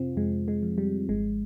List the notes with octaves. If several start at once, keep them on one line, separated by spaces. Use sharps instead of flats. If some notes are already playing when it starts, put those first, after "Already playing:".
Already playing: F2 C3 C4 F4
F2 G#3
G#3
F3
G3
G#1 G#3